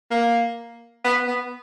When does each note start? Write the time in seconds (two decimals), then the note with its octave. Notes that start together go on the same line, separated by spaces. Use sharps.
0.11 A#3
1.04 B3
1.28 B3